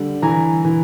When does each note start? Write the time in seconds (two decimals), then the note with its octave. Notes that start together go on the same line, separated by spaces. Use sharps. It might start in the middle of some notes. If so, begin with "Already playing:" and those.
Already playing: D3 G3
0.22 E3 G#5 A#5
0.65 E3